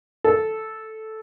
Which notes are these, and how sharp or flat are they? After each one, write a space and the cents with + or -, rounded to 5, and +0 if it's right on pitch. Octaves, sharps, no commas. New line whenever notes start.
A4 -5